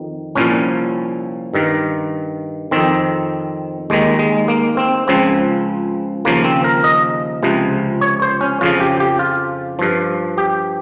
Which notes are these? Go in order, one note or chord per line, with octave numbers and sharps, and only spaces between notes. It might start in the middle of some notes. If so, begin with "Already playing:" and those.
Already playing: F2 D#3
C2 A#2 F3 C#4
G2 D#3
F2 D#3 C4
D#2 D#3 G#3
G#3
A#3
C4
C#2 C#3 F3 C4
D#2 C#3 F3 A#3
C4
A#4
D#5
C#2 C3 F3
C#5
C5
C#4
F2 C#3 F3 F4
G4
G4
F4
G2 F3
G4